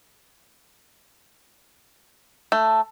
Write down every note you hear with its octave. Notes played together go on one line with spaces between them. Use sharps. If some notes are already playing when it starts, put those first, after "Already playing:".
A3